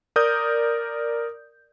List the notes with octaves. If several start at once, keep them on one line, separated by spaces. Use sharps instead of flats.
A#4 D5 D#6 G6